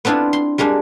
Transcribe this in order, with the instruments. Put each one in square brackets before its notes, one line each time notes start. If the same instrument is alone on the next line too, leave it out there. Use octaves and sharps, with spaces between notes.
[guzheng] B3 C4 D4 E4 F4
C6
G3 G#3 A#3 D4